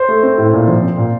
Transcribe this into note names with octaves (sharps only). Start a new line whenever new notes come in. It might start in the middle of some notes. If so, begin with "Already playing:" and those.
Already playing: C5
A3
C4
A2
A#2
F3
C4
A#2